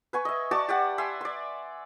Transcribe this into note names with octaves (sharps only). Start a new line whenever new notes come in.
B4 G#5 C#6
D#5 E5
F#4 D5 A5 C#6
G4 D5 F#5
E5 G#5 C6
D5 C6